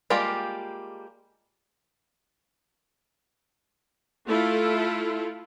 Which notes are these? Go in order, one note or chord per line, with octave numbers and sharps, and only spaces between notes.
G3 G#3 A#3 F4 G4
A3 E4 F4 A4